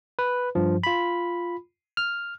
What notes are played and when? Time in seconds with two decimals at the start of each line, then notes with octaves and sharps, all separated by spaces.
0.19 B4
0.55 G2 F3
0.84 F4 B5
1.97 F6